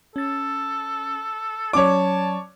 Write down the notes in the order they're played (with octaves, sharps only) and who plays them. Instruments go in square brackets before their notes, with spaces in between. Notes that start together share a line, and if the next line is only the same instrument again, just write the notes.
[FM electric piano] C#4 A6 [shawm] A4
[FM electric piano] F#3 C#4 D5 [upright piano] C#5 D6 [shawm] A5